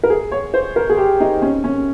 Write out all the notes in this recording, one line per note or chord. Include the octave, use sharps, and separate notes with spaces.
A#4
G#4
C#5
C5
A#4
G#4
G4
D#4
C#4
C#4